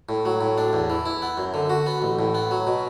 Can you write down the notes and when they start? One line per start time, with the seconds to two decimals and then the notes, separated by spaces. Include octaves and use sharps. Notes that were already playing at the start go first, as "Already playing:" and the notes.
0.09 A2
0.25 F#3
0.41 A2
0.58 D4
0.73 E2
0.90 E3
1.06 E4
1.22 B3
1.37 F#2
1.54 D3
1.70 F#4
1.86 B3
2.02 A1
2.19 A2
2.35 B3
2.51 F#3
2.67 B2